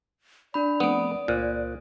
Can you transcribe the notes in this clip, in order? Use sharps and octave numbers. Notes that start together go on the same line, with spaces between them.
D4 D5 B5
F3 A3 B3 C4 D#6 D7
C#2 A#2 C5 F#6